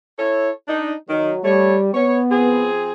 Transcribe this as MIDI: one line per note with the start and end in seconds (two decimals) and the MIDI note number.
0.18 0.50 64
0.18 0.50 69
0.18 0.50 73
0.68 0.93 62
0.68 0.93 63
1.09 1.32 51
1.09 1.39 54
1.44 1.91 55
1.44 1.76 57
1.44 1.76 73
1.94 2.69 59
1.94 2.19 73
2.30 2.93 53
2.30 2.93 60
2.30 2.93 68